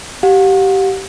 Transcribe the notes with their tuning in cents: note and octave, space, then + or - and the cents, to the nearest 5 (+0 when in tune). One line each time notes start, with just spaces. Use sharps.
G4 -20 F#5 -45